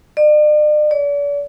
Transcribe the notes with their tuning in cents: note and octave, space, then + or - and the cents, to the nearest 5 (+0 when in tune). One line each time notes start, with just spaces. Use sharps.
D5 +45
D5 -40